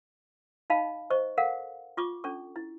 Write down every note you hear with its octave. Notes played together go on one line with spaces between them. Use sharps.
D#4 D#5 F5 A5 B5
C5 D#5 C#6
A4 A#4 F5 F#5
F4 C#6 D6
C#4 D4 A4 C#6
E4